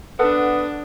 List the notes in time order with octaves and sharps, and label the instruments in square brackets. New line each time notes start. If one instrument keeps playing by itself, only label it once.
[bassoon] B3 [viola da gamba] D4 [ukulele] A4 B4 F#5 [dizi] D#6